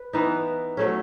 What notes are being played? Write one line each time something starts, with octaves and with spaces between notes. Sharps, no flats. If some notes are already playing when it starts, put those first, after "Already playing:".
Already playing: B4
E3 B3 D#4
F#3 A3 C#4